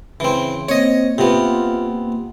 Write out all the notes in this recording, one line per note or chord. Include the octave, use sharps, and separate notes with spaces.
C#3 E3 C4
A#3 C4 C#5 D#5
C3 B3 F4